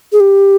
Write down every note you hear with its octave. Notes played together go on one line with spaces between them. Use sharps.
G#4
G4